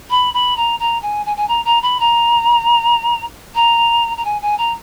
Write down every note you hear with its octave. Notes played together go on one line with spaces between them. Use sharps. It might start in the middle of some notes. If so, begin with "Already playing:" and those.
B5
B5
A#5
A#5
G#5
G#5
G#5
A#5
A#5
B5
A#5
A#5
A#5
G#5
G#5
A#5